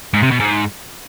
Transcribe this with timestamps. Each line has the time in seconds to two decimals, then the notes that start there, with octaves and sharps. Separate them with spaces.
0.14 G#2
0.22 C3
0.31 B2
0.40 G#2